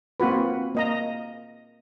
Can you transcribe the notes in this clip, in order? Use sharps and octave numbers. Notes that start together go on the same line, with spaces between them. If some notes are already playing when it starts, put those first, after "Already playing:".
A#3 C4 F4 F#4 B4
A#3 D#5 A#5